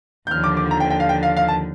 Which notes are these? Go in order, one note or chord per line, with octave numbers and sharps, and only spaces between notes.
G6
D#2 D3 F3 F6
D6
D6
A#5
G5
G5
F5
G5
F5
F5
A5